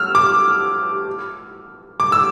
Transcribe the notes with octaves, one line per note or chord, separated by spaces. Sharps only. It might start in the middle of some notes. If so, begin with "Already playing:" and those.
Already playing: E6 F6
D6
D6
E6